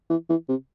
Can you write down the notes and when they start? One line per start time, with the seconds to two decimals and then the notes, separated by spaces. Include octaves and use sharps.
0.10 E3
0.29 E3
0.49 C3